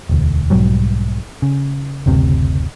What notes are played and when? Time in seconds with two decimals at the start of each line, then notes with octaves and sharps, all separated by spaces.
0.09 E1 D2
0.50 B1 G#2 F#3 G3
1.42 C#3
2.06 F#1 D2 C3